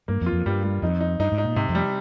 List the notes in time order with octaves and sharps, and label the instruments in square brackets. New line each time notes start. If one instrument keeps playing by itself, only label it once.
[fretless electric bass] G2 [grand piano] A#3
[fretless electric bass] F2
[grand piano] F4
[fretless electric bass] F2
[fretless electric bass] G2 [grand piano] G3
[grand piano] G3
[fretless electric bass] F2 [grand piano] D#4
[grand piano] D#4
[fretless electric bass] G2 [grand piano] D#4
[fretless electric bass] G#2
[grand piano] D#4
[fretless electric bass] A#2
[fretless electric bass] G#2 [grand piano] C3
[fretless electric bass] F2
[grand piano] G3